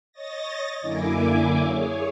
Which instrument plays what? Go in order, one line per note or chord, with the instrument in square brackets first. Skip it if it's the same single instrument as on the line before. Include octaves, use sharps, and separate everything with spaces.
[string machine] C#5 D#5 A6 A#6
F#2 D3 A#3 E4 G#5 D6
G#4 C#5